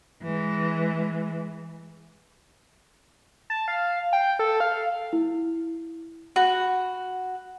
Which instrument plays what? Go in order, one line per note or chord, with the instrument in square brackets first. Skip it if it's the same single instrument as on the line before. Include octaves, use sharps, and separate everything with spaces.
[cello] E3 G#3
[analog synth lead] A5
F5
G5
A4
F5
[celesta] E4
[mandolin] F#4 [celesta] B5 F#6